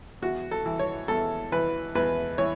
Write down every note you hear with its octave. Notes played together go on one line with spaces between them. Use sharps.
E2 F#4
A4
E3
C#5
E2 A4
E3 B4
E2 B4
E3 C#5